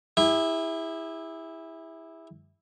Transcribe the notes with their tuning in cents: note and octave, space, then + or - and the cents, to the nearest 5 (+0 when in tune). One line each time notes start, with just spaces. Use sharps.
E4 -10 G#4 -45